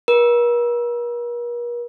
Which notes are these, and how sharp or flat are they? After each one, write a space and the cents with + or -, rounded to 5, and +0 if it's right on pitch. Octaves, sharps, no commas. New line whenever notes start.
A#4 +45